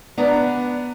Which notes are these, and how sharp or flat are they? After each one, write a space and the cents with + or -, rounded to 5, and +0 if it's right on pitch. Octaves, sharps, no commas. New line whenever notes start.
B3 +0 D4 +0 A#5 -15